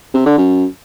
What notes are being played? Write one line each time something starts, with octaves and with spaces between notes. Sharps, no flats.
C3
D3
F#2